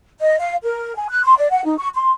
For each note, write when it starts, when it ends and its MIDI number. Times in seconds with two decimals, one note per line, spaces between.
0.20 0.35 75
0.39 0.55 77
0.64 0.94 70
0.96 1.08 80
1.09 1.23 90
1.24 1.35 84
1.37 1.49 74
1.51 1.63 78
1.65 1.75 63
1.78 1.89 85
1.94 2.11 84